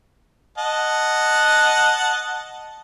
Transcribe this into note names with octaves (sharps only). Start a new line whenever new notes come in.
D#5 F#5 A5